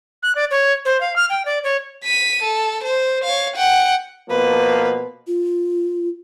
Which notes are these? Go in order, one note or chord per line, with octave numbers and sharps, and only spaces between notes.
F#6
D5
C#5
C5
F5
F6
G5
D5
C#5
B6 D#7
A4
C5
C#5 F5
F#5 G5
B2 F3 A#3 B4
F4